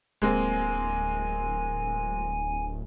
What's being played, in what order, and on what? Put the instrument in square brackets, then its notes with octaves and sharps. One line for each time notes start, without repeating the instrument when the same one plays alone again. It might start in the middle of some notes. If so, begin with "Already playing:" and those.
[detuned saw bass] D1 [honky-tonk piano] G#3 A#3 C4 [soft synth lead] G#5